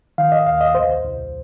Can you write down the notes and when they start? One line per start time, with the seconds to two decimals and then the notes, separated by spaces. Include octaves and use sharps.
0.18 D#3 F5
0.32 D#5
0.47 D#2 F5
0.61 D#5
0.75 C2 C5
1.04 C2